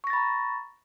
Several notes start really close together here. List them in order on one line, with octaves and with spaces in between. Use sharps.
C#6 A#6 A6 B5 A#5